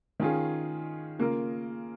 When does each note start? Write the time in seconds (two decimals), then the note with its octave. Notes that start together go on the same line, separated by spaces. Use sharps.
0.20 D#3 C#4 F4 G#4
1.19 C#3 A#3 F4 A#4